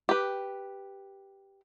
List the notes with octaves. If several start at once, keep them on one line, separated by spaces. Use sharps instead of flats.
G4 B4